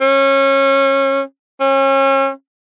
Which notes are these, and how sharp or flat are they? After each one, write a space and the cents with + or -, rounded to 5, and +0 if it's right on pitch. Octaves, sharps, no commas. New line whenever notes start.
C#4 -25
C#4 -35